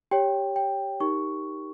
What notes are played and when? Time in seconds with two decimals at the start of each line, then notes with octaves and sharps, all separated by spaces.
0.11 G4 C#5 G5
0.56 G5
1.00 D#4 G4 A#4 C#6